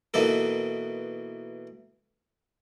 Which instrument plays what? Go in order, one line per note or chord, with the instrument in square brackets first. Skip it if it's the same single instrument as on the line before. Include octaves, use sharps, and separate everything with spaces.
[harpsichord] B2 E3 A#3 D#4 A4